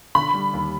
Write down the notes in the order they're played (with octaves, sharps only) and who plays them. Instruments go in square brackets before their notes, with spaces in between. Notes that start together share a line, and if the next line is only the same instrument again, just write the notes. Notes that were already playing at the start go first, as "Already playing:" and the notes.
[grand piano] D3 [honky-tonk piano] B5
[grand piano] G3
D#2